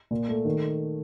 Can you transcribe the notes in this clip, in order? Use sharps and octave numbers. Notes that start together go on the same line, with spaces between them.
A#2
A3
D#3